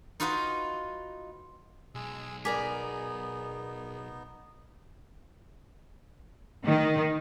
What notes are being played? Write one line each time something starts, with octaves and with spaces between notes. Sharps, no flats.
D#4 F4 F#4 B4 D#5
B1 G#3 G#4 E6
B3 D#4 G#4 A#4 D5 G#5 D6 B6
D#3